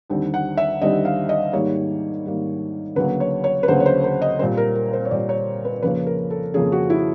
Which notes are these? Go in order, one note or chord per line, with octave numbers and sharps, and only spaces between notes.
D#2 D3 G3 C4
F#5
E5
D#2 D3 G3 C4 D#5
F5
D#5
G#2 D#3 G3 A#3 C#5
G#2 D#3 G3 A#3
D2 C#3 F#3 A#3 B4
C#5
C#5
B4
D2 C#3 F#3 A#3 C5
C#5
C5
C5
D#5
A#2 G3 C4 C5
A#4
A#4
C5
C#5
A#2 G3 C4 D5
C#5
B4
F2 C#3 F3 A#3 C#4 B4
A#4
A4
F2 C#3 F3 A#3 C#4 G#4
F#4
E4